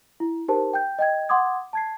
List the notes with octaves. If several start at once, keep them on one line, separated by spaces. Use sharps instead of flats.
E4
D#4 G4 A#4 C5 A5
G5 G6
D#5 G5 G#6
F#5 C6 D6 D#6 G#6
A5 G#6 C7